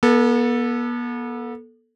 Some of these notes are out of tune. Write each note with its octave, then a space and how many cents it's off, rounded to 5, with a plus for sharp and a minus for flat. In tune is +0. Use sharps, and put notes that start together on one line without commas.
B3 -40 A4 +0